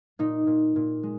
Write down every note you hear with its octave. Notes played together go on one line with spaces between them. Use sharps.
A#2 D#4
A#2
A#2
G#3